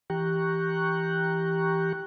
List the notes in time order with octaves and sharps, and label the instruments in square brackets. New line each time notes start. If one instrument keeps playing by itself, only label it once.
[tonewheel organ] E3 G4 G5 A#5 C#6 F#6